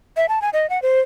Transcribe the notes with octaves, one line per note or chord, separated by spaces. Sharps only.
E5
A5
G#5
D#5
F#5
C5